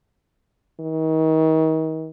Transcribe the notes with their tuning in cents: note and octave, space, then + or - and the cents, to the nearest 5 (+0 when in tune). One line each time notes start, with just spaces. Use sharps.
D#3 +35